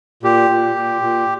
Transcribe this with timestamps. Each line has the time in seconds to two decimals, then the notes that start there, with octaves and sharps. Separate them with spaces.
0.23 A#2 G4
0.50 A#2
0.76 A#2
1.02 A#2